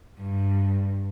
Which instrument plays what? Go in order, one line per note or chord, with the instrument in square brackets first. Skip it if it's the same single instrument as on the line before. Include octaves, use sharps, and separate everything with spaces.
[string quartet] G2